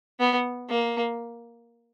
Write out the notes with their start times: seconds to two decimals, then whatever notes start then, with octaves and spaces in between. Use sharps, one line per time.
0.20 B3
0.70 A#3